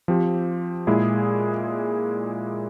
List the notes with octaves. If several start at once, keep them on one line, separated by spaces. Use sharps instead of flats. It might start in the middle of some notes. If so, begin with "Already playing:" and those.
F3 C4 G4
A#2 G#3 E4 G#4